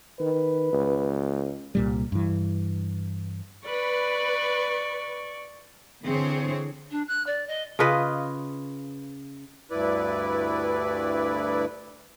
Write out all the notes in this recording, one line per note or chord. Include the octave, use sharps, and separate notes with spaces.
D#3 B4
C#2
C2 A#2 G3
G2 E3
B4 D5 C#6
D3 E3 C4 G#4 C5 C#5
D4
F#6
D5
D#5
C#3 F4 B4 D#5
D2 G2 E4 B4 D5